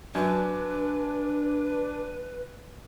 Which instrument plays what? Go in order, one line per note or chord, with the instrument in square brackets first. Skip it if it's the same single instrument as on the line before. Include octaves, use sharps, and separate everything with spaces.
[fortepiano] F#2 [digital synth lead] D4 [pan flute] B4